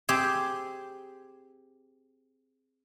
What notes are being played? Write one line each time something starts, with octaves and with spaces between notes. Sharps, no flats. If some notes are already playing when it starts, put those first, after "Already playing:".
C4 G4 G#4